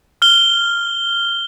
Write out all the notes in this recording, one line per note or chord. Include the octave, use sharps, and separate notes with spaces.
F6 G7